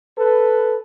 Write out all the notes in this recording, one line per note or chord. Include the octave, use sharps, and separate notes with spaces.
A4 B4